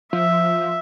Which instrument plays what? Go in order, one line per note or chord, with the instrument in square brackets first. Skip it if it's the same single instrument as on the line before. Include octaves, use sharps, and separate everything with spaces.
[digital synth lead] F3 [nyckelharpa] E5